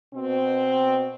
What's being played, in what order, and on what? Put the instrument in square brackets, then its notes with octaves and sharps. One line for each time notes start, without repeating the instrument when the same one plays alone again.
[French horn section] B2 C4